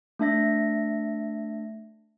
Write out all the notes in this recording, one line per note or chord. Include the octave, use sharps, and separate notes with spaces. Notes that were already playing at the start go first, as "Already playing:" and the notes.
A3 D4 E5 A#6